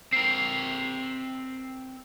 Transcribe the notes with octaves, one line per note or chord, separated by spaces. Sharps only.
C4 A#4 C7